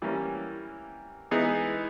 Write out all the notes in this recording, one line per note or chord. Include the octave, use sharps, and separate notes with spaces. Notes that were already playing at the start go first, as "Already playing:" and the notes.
E3 G3 A#3 C#4
E3 G#3 B3 D#4 G#4